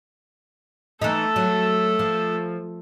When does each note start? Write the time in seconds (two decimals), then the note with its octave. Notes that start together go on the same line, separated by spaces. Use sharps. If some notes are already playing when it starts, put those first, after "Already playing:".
1.02 E3 A3 D#4 A4
1.36 F#3
1.99 F3